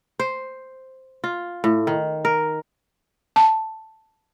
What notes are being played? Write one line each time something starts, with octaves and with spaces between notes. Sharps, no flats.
C5
F4
A2
D#3
A#4
A5